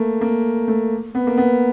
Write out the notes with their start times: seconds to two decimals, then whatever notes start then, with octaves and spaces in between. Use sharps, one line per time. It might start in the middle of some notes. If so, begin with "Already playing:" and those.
Already playing: A3 A#3
0.21 A#3
0.68 A3
1.15 B3
1.27 A#3
1.37 B3